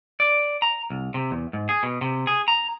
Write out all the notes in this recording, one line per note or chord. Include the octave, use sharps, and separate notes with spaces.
D5
A#5
C2
C3
E2
G#2
G#4
B2
C3
G#4
A#5